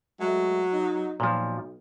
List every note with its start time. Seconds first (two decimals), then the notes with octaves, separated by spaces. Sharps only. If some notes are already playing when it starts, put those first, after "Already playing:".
0.21 F#3 G#3 A3
0.72 D#4
1.20 B1 A#2 F3